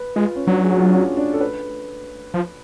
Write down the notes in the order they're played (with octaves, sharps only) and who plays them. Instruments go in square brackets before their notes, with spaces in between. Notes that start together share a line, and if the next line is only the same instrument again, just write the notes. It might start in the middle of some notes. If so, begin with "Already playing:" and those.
Already playing: [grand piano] B4
[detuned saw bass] G#3 [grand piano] F4
[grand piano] C#4
[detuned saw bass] F#3 [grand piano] D4
[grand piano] G#4
F#4
F4
D4
C#4
D4
A4
B4
[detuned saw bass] F3